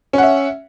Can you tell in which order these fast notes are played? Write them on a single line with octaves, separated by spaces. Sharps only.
C#4 F#5 E5